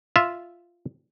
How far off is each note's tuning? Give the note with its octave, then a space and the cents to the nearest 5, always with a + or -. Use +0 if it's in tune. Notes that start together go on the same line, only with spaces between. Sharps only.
F4 -5 E5 +0